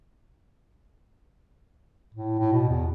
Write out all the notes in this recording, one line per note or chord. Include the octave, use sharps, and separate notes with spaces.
A2
A2
B2
E2